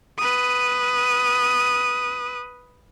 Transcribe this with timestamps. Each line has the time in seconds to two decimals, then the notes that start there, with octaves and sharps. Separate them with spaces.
0.18 B4 D#6